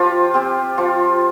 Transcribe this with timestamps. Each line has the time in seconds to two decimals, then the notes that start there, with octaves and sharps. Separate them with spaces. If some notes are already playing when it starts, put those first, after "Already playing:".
Already playing: F3 F4 G4
0.34 C4 G4
0.78 F3 F4